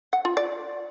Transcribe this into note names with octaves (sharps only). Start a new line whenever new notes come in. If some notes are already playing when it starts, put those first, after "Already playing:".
F#5
F4
D5